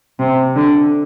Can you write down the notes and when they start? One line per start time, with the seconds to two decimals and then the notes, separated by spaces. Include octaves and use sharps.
0.19 C3
0.56 D3